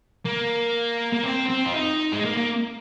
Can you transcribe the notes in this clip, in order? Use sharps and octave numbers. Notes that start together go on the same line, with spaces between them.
A#3
A#3
C4
C4
F4
D#4
G#3
A#3
A#3